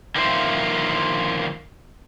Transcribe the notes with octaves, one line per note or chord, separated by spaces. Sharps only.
D3 D#3 F3 A#3 C5 E5